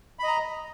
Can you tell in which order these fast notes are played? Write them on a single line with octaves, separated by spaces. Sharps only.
B5 D#5 A#5